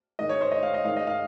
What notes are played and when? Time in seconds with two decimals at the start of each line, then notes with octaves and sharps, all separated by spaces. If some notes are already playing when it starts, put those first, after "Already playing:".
0.19 G#2 D#3 D#5
0.29 C#5
0.41 C5
0.52 D#5
0.63 F5
0.74 D#5
0.84 G#2 D#3 F5
0.97 D#5
1.07 F5